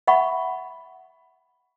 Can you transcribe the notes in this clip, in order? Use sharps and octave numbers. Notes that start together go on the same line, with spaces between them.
E5 F#5 B5 C#6